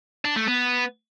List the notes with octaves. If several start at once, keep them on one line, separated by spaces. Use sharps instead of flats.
D4
A3
B3